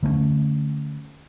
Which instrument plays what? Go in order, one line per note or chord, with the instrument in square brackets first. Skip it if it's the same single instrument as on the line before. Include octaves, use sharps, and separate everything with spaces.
[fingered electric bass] D3 A3 A#3 C#4